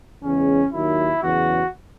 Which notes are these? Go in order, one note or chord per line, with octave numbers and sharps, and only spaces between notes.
E2 C#3 G#3 C#4
D#2 D#3 F#3 E4
E2 C#3 F#3 F#4